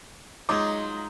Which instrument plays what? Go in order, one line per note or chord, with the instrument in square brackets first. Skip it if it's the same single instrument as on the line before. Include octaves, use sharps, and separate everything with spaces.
[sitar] F#3 F4 [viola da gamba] G#3 [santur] D#4 [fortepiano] D6